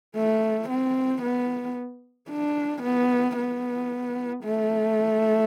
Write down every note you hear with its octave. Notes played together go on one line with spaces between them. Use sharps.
A3
C4
B3
D4
B3
B3
A3